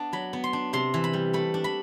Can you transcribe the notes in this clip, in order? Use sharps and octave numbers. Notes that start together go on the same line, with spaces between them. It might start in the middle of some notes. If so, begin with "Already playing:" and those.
Already playing: B3 D4 A5
F#3 B5
B3
C6
D4
C3 C6
E3
B5
G3
A3 B5
D4
B5